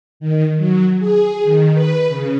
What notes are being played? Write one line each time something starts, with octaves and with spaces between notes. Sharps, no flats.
D#3
F#3
G#4
D#3
B4
C#3